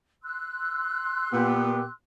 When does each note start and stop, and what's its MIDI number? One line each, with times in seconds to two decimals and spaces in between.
0.23 1.92 84
0.23 1.92 88
0.23 1.92 90
1.33 1.83 46
1.33 1.83 59
1.33 1.83 67